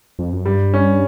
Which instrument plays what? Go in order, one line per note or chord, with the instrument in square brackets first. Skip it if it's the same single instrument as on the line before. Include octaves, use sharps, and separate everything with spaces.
[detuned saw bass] F2
F#2
[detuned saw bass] G2 [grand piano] G3
[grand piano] C#4